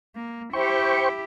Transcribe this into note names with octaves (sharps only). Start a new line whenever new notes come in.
A#3
E4 G4 C5 G5 C#6